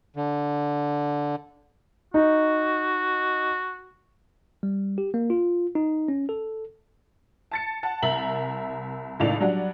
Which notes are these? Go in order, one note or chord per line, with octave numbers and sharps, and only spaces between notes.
D3
D#4 F#4
G3
G4
A#3
F4
D#4
C#4
A4
A5 A6 C#7
F#5 A5
C2 A#4 E5 A#5 F#7
C#2 A2 D#3 D5 F7
F#3 G3 D4 F#4 D5 F#5